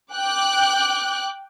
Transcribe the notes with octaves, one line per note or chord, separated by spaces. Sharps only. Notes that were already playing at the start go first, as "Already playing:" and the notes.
G5 D6 F#6